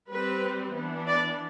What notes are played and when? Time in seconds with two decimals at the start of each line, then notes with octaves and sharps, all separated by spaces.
0.11 G3 C4 B4
0.75 E3 B3 D4
1.07 D5